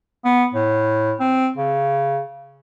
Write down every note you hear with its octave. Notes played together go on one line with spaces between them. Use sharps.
B3
A2
C4
C#3